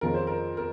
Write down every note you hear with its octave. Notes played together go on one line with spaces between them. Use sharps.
F2 D#3 G#3 C#4 F4 A#4
C5
A#4
A#4